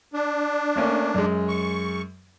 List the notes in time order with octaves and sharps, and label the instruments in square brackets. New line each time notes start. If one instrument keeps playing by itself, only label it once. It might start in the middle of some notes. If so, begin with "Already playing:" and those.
[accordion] D4
[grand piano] A3 A#3 C#4
F#2 G#3
[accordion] C#6